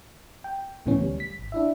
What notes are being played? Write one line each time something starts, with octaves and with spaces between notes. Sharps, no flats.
G5
C#2 A2 C#3 E3 B3 C#4
D2 G3
B6
G#1
D4 E4 E5